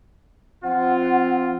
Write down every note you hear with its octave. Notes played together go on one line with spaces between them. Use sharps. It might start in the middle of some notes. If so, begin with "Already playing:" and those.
F3 C4 F4 F#5